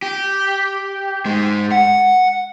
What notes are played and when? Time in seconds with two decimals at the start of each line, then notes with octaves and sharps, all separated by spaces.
0.02 G4
1.25 G#2 G#3
1.72 F#5